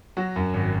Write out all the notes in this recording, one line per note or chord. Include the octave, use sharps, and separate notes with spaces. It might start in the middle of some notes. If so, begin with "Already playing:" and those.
F#3 F#4
F#2
G#1